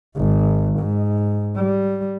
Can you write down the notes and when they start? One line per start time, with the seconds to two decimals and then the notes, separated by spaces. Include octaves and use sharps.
0.16 G#1
0.79 G#2
1.56 G3